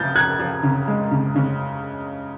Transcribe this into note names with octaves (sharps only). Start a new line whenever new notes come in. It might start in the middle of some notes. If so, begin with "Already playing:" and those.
Already playing: C#3 F3 G6 A6
F3 F#6 G#6
F3
C#3
G#3
C#3
C#3